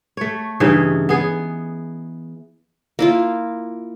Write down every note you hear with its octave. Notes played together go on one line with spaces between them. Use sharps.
A3 C#5
G2 C#3 E3 D#4
B3 G#4
A#3 E4 F4